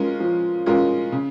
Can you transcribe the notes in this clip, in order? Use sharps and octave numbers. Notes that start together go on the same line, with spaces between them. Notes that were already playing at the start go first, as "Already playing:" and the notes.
Already playing: G#3 C#4 F4 A#4
F3
G#3 C#4 F4 A#4
C#3